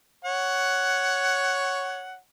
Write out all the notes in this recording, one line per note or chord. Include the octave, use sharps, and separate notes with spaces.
C#5 F#5